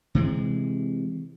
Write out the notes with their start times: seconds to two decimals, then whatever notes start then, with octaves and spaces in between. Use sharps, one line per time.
0.15 C3 E3 G#3